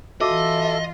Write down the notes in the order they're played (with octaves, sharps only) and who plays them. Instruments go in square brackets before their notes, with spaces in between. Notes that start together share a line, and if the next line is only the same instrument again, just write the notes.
[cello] E3 F4 [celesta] F#4 D6 [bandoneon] A4 E5 [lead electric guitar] D#5